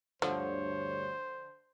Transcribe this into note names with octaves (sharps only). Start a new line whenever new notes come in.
D2 G2 D3 F3 C5 C#5